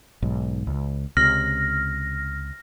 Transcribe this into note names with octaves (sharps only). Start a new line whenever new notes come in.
B1 G#2
C#2
C#2 C3 F6 A#6